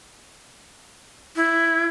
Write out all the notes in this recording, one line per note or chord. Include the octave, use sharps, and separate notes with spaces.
E4